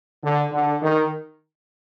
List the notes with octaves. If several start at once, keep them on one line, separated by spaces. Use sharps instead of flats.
D3
D3
D#3